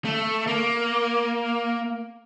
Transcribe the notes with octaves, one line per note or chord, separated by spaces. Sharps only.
A3
A#3